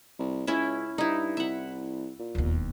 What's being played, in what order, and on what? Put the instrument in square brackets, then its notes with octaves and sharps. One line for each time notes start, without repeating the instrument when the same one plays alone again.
[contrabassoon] C2
[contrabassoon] C#2 [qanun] C#4 E4 E5
[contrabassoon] G2 [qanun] D#4 E4
[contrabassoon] C2 [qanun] E5 F#5
[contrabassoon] A#2
[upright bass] E1 D#2